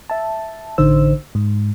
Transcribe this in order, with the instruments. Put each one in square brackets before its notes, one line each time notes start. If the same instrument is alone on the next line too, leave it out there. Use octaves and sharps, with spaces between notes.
[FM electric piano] E5 A5
A1 D3 D#4 C5 E6
G#2